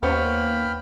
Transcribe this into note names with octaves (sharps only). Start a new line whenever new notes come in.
D#2 A#3 B3 C#4 C5 G5 B5 F6